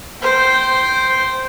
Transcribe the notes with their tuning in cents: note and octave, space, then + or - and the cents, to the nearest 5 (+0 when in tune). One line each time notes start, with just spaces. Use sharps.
C5 +0 G5 -15